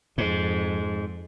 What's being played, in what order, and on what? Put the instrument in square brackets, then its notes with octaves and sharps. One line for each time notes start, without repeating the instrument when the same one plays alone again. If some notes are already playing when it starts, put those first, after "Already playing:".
[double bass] F2 [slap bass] G#2